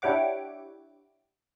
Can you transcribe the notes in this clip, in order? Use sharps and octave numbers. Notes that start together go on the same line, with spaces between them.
D4 E4 G4 C#5 F#5 D6